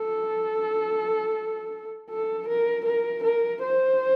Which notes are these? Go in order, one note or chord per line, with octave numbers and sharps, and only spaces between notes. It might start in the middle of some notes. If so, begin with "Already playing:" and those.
Already playing: A4
A4
A#4
A#4
A#4
C5